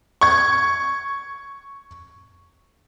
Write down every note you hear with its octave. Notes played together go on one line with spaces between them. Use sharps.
C#6 G#6